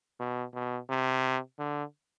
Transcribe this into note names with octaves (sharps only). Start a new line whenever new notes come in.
B2
B2
C3
D3